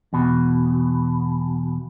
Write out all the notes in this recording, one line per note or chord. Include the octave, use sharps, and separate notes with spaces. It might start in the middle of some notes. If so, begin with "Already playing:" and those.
E2 B2